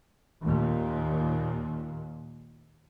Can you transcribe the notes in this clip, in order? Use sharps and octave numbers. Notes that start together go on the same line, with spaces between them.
D#2 A#2